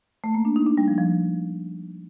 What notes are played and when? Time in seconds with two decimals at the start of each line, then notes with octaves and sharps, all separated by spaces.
0.24 A3
0.34 A#3
0.45 D4
0.56 D#4
0.66 D4
0.77 G3
0.88 F3
0.98 F3